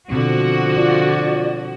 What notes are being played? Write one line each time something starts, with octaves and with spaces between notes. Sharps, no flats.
B2 D3 F3 C4 F#4
F4 D5